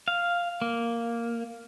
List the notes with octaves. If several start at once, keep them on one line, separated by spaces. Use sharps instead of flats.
F5
A#3